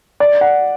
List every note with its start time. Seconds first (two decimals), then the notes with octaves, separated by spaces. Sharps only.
0.20 D5
0.41 F#5